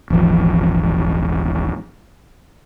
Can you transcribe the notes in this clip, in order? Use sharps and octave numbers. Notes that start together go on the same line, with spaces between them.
D#1 G#1 E3 F3